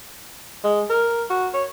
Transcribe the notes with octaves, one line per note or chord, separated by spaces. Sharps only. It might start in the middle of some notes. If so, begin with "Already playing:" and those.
G#3
A#4
F#4
C#5